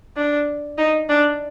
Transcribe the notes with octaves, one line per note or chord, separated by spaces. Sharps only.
D4
D#4
D4